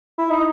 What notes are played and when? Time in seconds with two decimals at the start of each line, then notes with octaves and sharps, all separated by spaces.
0.18 E4
0.30 D#4